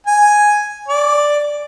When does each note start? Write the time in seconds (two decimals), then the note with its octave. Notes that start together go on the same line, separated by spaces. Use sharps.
0.06 G#5
0.88 D5